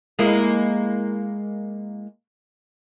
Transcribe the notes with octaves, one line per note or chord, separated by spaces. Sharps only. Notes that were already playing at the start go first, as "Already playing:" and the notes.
G#3 A#3 E4